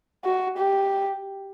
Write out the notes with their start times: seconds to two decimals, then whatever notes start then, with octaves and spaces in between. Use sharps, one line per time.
0.24 F#4
0.57 G4